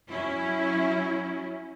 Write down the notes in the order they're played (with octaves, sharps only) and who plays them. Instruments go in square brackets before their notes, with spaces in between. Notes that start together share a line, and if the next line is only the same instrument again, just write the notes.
[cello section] F#3 C#4 E4